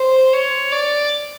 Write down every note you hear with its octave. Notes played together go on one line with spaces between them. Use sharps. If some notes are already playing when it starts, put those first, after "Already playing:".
Already playing: C5
C#5
D5